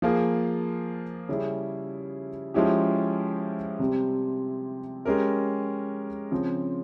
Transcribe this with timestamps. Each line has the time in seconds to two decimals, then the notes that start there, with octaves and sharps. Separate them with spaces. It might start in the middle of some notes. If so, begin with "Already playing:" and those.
0.02 F3 A#3 F4 G#4
1.29 C#3 G3 C#4 E4 G#4
2.54 F3 G#3 C#4 E4 G4
3.79 C3 G3 C4 G4
5.05 G#3 C#4 G4 A#4
6.31 C#3 F3 C4